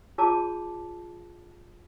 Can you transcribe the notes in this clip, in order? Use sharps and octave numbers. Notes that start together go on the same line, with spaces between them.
F4 G#4 C#5 A5 A#5 D6